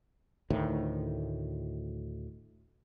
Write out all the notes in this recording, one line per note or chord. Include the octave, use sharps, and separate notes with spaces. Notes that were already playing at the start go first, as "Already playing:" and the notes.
D2 A2 D#3